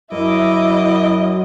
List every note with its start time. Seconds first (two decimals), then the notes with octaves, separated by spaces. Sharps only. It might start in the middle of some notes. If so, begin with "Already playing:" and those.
0.12 F#2 E4 D#5 E5 D6